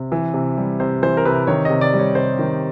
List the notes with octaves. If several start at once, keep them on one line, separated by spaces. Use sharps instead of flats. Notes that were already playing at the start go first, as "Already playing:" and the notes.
Already playing: C3
E3
C3
G3
C3 C5
E3 C5
A#4
C3 B4
D#3 C#5
C3 D#5
D5
G3
C#5
C3 C5
D#3